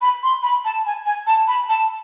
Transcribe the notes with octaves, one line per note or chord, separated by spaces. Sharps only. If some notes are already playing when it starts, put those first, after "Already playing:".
B5
C6
B5
A5
G#5
G#5
A5
B5
A5